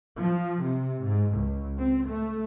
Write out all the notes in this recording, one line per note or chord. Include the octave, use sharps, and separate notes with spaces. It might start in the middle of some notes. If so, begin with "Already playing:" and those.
F3
C3
G#2
C#2
C4
A3